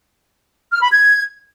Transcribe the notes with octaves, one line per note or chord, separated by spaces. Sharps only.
F6
B5
G#6